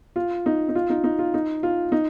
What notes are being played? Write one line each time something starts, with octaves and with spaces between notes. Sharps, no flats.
F4
D#4
D#4
F4
D#4
D#4
F4
D#4
F4
D#4